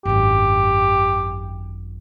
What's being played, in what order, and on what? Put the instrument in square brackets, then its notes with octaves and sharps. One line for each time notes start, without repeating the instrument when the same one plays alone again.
[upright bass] G#1 F#2 [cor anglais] G4